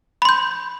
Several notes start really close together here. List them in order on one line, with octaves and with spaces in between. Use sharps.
B5 C6 G6